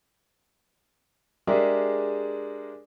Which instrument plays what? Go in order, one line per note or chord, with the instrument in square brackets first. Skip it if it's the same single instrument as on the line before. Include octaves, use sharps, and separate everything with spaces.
[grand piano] G#3 D4 G4 G#4 A#4 E5